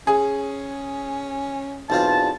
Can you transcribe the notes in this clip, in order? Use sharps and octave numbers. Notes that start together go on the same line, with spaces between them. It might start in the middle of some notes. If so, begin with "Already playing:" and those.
C#4 G#4
B1 E2 C4 F4 A5